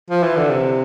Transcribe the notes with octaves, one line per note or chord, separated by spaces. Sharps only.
F3
E3
D3
C3